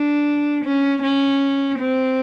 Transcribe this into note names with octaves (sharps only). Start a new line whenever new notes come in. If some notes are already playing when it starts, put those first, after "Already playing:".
Already playing: D4
C#4
C#4
C4